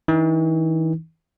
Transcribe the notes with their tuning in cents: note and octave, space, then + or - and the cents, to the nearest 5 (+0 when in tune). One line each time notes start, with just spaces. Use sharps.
E3 -40 D4 +45